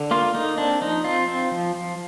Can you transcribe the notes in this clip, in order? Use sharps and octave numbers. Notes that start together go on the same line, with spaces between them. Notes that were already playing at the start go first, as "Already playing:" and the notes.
Already playing: D3
A#3 F4
A#3 D#4
C4 D4
F3 D#4
C4 F4
C4
F3
F3